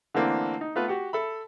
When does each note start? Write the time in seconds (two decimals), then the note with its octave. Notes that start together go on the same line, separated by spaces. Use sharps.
0.14 D3 E3 A3 A#3 C4 D4
0.61 D#4
0.76 A3 B3 F4 B4
0.88 F#4 G4 F#5
1.13 A4 E5 B5